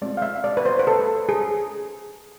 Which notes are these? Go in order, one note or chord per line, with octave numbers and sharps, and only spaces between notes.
G#3 C4 F4 D5
F5
E5
D5
B4
C5
B4
A4
G#4